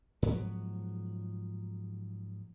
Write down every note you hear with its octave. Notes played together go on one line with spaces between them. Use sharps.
G#2 F3 F#3 B3